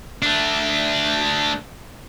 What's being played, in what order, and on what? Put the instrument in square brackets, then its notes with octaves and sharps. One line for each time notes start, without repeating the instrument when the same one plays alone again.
[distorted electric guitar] A3 D4